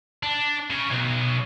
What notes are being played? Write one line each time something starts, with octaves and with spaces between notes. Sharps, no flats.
D4
C#3
B1